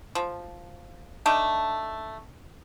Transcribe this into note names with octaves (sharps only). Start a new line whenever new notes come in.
F3
A3 D4 D#4